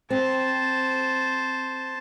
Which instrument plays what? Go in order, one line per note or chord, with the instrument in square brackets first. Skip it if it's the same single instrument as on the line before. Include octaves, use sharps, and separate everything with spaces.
[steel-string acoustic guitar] C4 [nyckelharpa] C5 A5